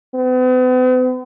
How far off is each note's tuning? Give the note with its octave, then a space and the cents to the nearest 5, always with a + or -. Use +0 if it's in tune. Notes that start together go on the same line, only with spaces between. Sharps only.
B3 +45